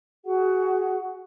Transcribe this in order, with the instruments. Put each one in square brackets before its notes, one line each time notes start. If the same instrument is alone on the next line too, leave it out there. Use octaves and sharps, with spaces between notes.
[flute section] F#4 G#4 F#5